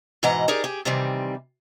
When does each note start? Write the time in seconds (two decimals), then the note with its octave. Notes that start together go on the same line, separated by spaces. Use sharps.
0.23 G#2 B2 E3 D#5 F#5 A#5
0.48 D#4 G4 G#4 A#4 D5
0.64 G4 G#4
0.85 C3 D#3 E3 G3 C4